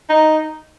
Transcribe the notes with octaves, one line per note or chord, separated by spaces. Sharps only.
D#4